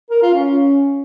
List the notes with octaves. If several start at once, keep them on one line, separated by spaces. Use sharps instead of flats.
A#4
F4
C#4